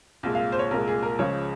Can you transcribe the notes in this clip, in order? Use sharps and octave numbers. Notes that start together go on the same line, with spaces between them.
C2 A#2 G#3
F5
C5
C#5
C2 A#2 G#3 A#4
G#4
A#4
C#2 C#3 F3 G#3 C#5